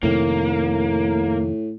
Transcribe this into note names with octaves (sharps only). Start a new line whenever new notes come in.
F2 A2 C3 D#3 A#3